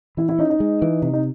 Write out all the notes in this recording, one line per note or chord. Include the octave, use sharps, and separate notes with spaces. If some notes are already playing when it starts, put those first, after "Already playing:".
E3 E4
E4
C#4 D#4
D#4
G#3
E3
C3 D#4
D#4